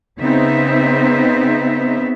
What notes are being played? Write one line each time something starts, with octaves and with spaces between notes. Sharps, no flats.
C#3 B3 C4 D#4 E5